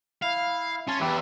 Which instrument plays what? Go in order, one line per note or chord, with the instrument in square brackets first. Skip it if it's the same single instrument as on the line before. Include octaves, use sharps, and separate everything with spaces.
[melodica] E4 [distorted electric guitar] F5
[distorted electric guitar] C#4 [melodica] A5 C6
[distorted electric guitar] E2 [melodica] G4 B4 E5